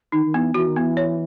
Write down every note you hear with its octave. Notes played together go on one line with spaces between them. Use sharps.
D#3 D#4
D#3
E3 B3
E3 F#4
D#3
E3 B3
C#5